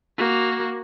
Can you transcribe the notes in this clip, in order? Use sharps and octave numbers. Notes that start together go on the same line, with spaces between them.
A#3 F#4